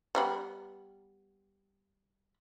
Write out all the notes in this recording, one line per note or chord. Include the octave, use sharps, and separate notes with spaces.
G3 B3 B5